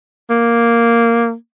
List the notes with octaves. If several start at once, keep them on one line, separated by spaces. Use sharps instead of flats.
A#3